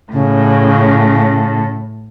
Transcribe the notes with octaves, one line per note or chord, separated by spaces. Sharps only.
A2 C#3